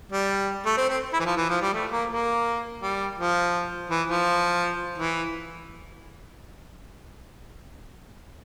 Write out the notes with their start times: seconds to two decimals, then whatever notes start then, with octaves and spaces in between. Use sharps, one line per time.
0.12 G3
0.66 A3
0.77 C4
0.89 C4
1.13 E4
1.20 E3
1.25 F3
1.37 E3
1.49 F3
1.62 G3
1.73 A3
1.91 A#3
2.10 A#3
2.82 G3
3.18 F3
3.90 E3
4.08 F3
4.98 E3